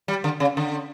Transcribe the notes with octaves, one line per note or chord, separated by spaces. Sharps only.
G3
D3
C#3
D3